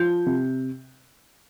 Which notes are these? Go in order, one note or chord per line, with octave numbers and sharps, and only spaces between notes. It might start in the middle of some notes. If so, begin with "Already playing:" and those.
Already playing: F3 G6
C3